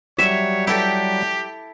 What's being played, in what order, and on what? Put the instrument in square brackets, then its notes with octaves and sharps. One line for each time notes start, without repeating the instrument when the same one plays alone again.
[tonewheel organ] F#3 G3 [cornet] C#5 [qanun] E5
[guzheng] E4 A4 G5 [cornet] G4